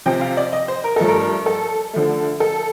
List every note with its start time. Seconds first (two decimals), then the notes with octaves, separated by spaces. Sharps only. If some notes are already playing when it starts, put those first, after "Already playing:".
0.06 C3 F3 C4 G5
0.21 F5
0.37 D5
0.52 D#5
0.68 C5
0.84 A#4
0.96 G2 F3 A3 A4
1.08 A#4
1.46 A4
1.93 D3 F3 A3
2.40 A4